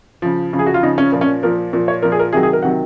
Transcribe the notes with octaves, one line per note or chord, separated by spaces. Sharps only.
C#3 F3
C#3 F3
G#4
F#4
F4
C#3 F3 D#4
C#4
A#2 F3
C#4
A#2 F3 A#4
A#2 F3
C#5
A#2 F3 A#4
G#4
A#4
C3 D#3 F#3 G#4
G#4
A#4
C3 D#3 F#3 F#5